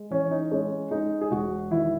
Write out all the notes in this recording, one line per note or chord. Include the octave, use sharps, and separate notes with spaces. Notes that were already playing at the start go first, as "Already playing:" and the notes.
Already playing: G#3
E3 C#4
D#4
G#3 C#4
G#3 D#4
G#4
E1 F#4
D#3 E4